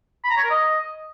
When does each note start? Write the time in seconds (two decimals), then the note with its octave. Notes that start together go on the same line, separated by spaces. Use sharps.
0.24 B5
0.31 A#5
0.37 C#5
0.44 A#4
0.50 D#5